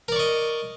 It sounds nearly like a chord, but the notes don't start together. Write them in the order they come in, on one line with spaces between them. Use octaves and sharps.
A#4 D5 C#6 D#5